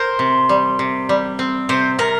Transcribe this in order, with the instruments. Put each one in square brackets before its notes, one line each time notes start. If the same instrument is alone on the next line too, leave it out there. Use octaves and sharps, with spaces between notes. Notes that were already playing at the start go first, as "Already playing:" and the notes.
Already playing: [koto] A#4 [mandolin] C5
[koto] C3
G3
C3
G3
C4
[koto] C3 [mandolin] C5
[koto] C3 [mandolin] A#4